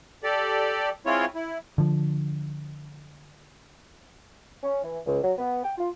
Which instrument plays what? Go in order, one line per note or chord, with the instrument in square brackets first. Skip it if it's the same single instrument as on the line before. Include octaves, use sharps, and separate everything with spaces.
[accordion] G4 A4 D5
G#3 C4 E4 F4 C#5
E4
[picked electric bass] D3 F3
[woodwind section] C#4
E3
C#2
F#3
B3
G5
F4